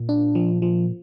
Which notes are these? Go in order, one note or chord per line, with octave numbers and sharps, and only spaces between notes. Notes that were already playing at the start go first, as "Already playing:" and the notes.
Already playing: A#2
D4
F3
F3